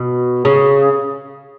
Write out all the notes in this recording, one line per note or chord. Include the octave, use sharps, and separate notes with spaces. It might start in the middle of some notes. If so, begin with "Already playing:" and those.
Already playing: B2
C#3